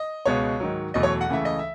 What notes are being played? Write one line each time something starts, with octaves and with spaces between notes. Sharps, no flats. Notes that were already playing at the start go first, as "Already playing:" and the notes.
Already playing: D#5
C#2 B2 G#3 B3 C#5
G#2 D#3 F#3
E2 B2 F#3 A3 D#5
C#5
F#5
C#2 C#3 E3 A3 E5
D#5
E5